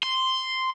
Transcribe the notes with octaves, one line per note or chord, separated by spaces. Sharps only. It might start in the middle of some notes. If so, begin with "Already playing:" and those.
C6